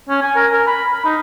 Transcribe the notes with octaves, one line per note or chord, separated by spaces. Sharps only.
C#4
G#5
A#4
A#4
B5
B5
D#4